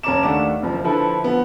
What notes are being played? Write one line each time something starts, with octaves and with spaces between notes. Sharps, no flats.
F#1 C#4 A5 A#5 D6 E7
D#2 A3 D4 F#5 D6 E7
F#1 F3
D3 F3 E4 A4 B4
F3 B3